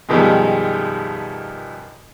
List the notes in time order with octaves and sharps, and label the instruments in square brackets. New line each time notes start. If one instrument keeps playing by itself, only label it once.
[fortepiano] F#2 B2 D#3 F3 G3 G#3